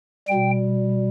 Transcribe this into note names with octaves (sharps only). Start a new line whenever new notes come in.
B2 G3 G5